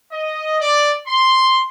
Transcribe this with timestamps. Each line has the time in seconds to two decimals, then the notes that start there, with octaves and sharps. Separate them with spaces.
0.12 D#5
0.60 D5
1.07 C6